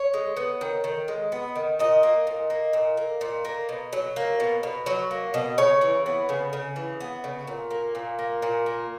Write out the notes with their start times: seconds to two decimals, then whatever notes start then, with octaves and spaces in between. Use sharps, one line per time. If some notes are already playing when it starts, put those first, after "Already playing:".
Already playing: C#5
0.14 G#3
0.37 B3
0.61 D#3
0.84 D#3
1.08 G#3
1.32 B3
1.55 D#3
1.79 A#2 D#5
2.03 A#3
2.27 A#2
2.50 A#3
2.73 A#2
2.97 A#3
3.21 A#2
3.45 A#3
3.69 B2
3.93 F#3
4.16 A#3
4.40 B2
4.63 B2
4.86 F#3
5.11 A#3
5.34 B2
5.58 C#3 C#5
5.81 E3
6.06 B3
6.29 C#3
6.53 C#3
6.76 E3
7.01 B3
7.24 C#3
7.47 A#2
7.71 A#3
7.95 A#2
8.19 A#3
8.42 A#2
8.66 A#3